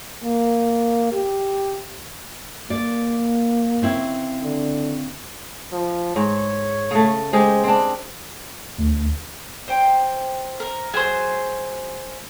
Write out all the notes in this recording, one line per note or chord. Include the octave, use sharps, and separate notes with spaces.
A#3
G4
A#3 D5
C#3 C4 E4
D3
F3
G#2 C#5
C#3 A3
G#3 G4 G#4 C5
C4 D4
D2
C5 G5
A#4
F#3 G#4 C5